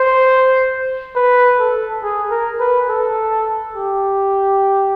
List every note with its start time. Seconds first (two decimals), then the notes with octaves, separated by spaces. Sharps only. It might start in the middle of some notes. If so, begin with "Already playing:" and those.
Already playing: C5
1.16 B4
1.59 A4
2.03 G#4
2.31 A#4
2.60 B4
2.89 A4
3.75 G4